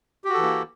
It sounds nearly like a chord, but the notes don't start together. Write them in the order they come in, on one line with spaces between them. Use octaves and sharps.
G4 F#4 A4 E3 A#3